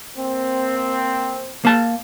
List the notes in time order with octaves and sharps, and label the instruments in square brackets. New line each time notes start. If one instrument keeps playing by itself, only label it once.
[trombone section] A#3 C4
[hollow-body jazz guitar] A#3 A5